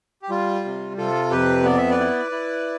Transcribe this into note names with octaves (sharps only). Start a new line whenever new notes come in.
G4
G3 F4
C3
C3 F4 A4
F2 G4 B4
B3 D5
E5
B4 D5
E4
E4